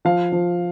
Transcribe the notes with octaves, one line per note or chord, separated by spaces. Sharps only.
F3 F5
F3